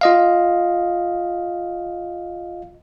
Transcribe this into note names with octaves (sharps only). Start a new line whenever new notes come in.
F4 D#5 F5